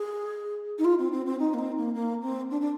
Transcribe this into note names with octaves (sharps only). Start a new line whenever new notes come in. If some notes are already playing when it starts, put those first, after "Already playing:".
Already playing: G#4
D#4
F4
C4
C4
C4
D#4
A#3
C4
A#3
A#3
C4
D4
D4